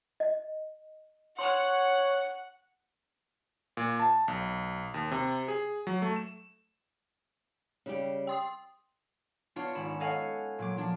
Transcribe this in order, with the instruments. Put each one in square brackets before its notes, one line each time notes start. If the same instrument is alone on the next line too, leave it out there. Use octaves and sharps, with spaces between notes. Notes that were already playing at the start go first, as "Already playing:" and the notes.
[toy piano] D#5
[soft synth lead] C#5 [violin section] F#5 F#6 [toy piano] C6
[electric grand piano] A#2
A5
B1
D#2
C3
G#4
F#3
A3
E7
[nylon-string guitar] C#3 G3 G4
[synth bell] G5 C6 D#6
[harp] B3 D4 F4 C#5
G#1 C#4 B5 E7
A4 C#5 D#5 F5 F#5 G#5
A#2 F#3 D6
F3 D4